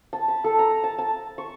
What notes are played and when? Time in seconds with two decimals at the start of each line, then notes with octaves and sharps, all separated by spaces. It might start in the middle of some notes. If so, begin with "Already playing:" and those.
0.13 A5
0.28 B5
0.44 A4
0.59 A#5
0.84 A5
0.98 A5
1.38 C#6